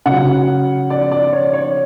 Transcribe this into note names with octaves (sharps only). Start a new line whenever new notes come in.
C#3 F#3 F#5
D5
D5
C#5
C#5